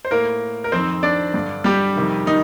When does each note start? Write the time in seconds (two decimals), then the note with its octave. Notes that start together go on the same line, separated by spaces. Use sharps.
0.05 C5
0.11 A2 A#3 A#4
0.64 A#4
0.72 F2 D#3 C4 C5
1.03 D4 D5
1.34 G2 D3
1.64 G3 G4
1.96 F2 C3 D#3
2.26 D#3 D#4